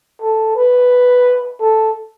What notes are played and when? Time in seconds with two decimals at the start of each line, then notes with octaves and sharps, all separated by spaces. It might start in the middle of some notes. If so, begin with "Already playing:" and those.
0.21 A4
0.56 B4
1.61 A4